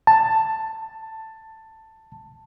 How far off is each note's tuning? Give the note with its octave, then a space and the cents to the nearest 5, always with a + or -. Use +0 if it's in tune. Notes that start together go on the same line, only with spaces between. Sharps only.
A5 +10